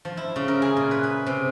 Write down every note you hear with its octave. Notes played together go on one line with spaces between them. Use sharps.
F3
E4
C#3
A#4
G#4
A#2
B4
B4
C3